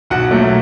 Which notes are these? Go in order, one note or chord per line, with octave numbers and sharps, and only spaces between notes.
B1 F#4 F#5
A#2 F#3 A3